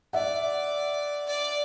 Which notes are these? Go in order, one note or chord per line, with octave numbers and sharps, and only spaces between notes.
D5 E5 F#5
D5